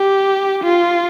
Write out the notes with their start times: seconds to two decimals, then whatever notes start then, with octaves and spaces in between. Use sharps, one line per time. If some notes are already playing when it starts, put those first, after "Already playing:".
Already playing: G4
0.64 F4